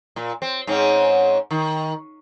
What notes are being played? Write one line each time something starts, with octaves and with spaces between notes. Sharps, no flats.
A#2
C4
G#2 C4 C#4
D#3